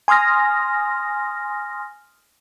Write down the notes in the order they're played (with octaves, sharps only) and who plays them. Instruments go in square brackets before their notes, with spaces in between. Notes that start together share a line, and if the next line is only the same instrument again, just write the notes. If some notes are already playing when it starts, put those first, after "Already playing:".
[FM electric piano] G#5 C6 D#6 F6 A#6